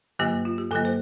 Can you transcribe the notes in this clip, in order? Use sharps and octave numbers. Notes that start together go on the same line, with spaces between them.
G2 D3 F#3 A#3 G4
F4
G4
G2 D3 F#3 A#3 A4
C5